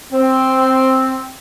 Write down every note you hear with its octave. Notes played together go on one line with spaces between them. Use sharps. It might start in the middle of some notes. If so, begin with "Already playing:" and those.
C4